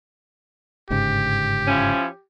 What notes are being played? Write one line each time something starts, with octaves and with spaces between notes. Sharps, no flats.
G1 G#2 C#3 G4
F3 C#4 E4